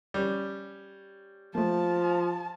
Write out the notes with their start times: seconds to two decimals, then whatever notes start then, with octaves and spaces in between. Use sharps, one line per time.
0.14 G3 C#4
1.55 F3 A3 A#3 A5